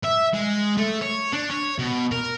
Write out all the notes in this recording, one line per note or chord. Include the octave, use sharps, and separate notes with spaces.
E5
G#3
A3
C#5
D4
C#5
B2
A#4